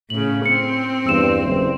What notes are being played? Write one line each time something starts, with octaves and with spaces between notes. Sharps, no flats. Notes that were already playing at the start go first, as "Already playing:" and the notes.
A2 C#3 F#7
C4 C#7
E2 G2 E6 E7
F#1 C5